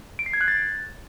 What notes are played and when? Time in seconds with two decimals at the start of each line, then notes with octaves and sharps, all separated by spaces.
0.19 D7
0.26 C7
0.33 G#6
0.41 F#6
0.48 A6